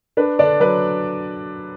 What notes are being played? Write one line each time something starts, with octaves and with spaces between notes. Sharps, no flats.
D4 B4
D3 D4 D5
F#3 B4